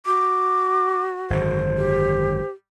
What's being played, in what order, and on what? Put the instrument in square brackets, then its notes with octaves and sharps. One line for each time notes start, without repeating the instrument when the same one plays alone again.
[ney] F#4 [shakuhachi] D6
[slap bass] G#1 F#2 D3 [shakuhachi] C5
[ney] G4